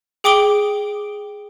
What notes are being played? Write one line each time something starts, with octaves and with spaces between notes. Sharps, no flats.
G#4 G5 D6 D#6 D7 G7